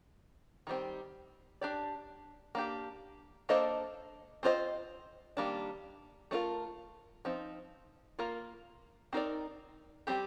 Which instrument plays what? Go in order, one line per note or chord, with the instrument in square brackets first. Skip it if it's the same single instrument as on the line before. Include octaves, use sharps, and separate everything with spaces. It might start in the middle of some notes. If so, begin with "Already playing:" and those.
[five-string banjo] D#3 G3 C4
D4 G4 D5
A#3 D4 G4
A#3 D4 A4 C5 D#5
C4 F4 C5 D#5
D#3 G3 A#3 D4
A3 D4 F4 A#4
F3 C4 D#4
A#3 F4 A#4
C4 D#4 A#4 D5
G3 C4 G4